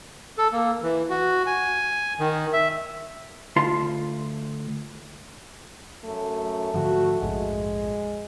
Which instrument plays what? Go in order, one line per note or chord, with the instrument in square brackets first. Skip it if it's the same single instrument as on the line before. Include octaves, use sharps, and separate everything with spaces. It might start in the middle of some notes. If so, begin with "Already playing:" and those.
[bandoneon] A4
A#3
E3
F#4
G#5
D#3
E5
[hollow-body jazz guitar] D2 F4 F5 A5 C6
[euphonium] F#2 [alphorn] A3
[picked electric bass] G#2 D3 F3 [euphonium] F#4
[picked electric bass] A#1 F2 G#2 [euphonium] G#3